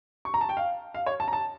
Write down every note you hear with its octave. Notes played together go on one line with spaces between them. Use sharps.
C#6
A#5
A5
G5
F5
F5
C#5
A5
A#5
A5